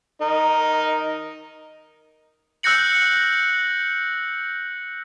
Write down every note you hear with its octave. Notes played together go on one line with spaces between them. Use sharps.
D#4 A#4
E6 F#6 G6 A#6 C#7 F#7